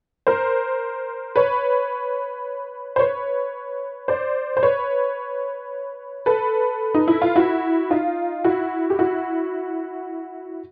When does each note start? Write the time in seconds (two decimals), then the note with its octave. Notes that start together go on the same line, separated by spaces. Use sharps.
0.27 A#4 C5
1.36 B4 C#5
2.96 C5
2.99 B4 C#5
4.08 C5 D5
4.57 C5
4.63 B4 C#5
6.26 A4 B4
6.95 D#4
7.08 E4
7.22 F4
7.36 E4 F#4
7.90 D#4 F4
8.44 E4 F#4
8.90 G4
8.99 E4 F#4